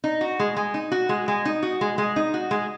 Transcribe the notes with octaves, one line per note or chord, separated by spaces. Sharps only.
D#4
F#4
G#3
G#3
D#4
F#4
G#3
G#3
D#4
F#4
G#3
G#3
D#4
F#4
G#3